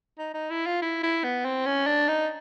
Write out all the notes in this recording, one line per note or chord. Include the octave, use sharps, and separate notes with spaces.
D#4
D#4
E4
F4
E4
E4
B3
C4
C#4
D4
D#4